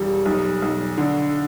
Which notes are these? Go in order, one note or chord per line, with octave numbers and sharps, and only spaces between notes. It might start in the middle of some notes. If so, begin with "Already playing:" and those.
Already playing: E1 G3
B1
B1
D3